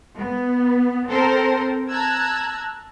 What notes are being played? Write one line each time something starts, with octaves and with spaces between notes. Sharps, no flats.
B3
C4 A4 A#4 C5
A5 A#5 E6 F#6 G#6